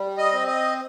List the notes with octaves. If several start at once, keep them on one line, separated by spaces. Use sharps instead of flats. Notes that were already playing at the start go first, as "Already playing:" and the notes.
Already playing: G3
D#5
C4
D#5